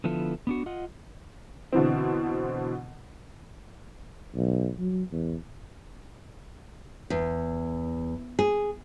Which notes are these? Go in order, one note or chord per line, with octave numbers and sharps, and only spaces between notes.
D3 F3 B3 E4 F4 A4
B3 D4 F#4
F4 D#5 F#5
B2 D3 E3 C4
B1
F#3
E2
E2
G#4